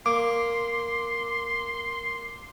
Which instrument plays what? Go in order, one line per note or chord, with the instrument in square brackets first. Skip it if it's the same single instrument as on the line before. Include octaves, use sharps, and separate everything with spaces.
[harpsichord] A#3 [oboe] C6 [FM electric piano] D6